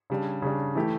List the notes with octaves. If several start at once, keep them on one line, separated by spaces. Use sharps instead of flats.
C#3 G3 D4
C#3 G3 D4
E3 A3 E4 G4